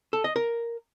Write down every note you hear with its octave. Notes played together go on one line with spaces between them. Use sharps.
A4
D#5
A#4